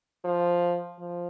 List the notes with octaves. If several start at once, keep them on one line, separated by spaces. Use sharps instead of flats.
F3
F3